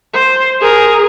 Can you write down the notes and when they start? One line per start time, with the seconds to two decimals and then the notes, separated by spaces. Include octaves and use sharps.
0.13 C5
0.61 G#4 A#4